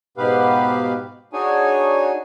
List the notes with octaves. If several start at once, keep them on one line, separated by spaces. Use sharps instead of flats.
G#2 B2 B3 G4 B4 F5
D4 D#4 F#4 G#4 C#5 G#5